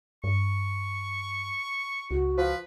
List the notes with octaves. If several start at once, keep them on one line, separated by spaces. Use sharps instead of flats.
G2 C#6
C#2 F#4
F3 B4